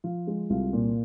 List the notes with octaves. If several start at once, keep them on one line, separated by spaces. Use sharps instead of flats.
F3 F4
G#3
C2 F4
A#2